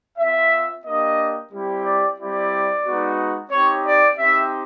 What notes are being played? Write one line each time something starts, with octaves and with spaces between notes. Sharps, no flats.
C4 F4 E5
A#3 D4 G4 D#5
G3 C4 E4 G4
D5
G3 C4 E4 G4 D5
G#3 B3 D#4 F#4
C4 D#4 G4 C#5
D5
C4 D#4 G4 E5